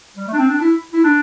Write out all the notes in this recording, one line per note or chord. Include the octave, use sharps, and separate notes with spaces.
G3
A3
D4
C4
D4
E4
E4
D4